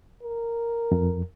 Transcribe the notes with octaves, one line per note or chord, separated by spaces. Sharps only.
A#4
F2